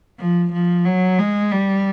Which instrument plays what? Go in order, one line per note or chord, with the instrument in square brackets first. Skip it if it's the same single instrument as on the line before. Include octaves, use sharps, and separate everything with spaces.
[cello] F3
F3
F#3
G#3
G3